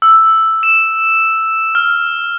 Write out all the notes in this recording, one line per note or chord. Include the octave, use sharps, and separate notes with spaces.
E6
E7
F6